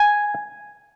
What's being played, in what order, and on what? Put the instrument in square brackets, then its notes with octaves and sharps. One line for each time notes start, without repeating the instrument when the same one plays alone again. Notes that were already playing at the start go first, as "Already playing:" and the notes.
Already playing: [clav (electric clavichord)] G#5